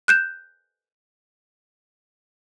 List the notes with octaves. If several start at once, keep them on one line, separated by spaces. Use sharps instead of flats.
F#6 G6 E7